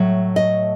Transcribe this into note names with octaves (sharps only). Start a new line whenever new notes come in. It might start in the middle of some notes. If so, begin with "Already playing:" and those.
Already playing: A2 F#3 A3 E5
D#5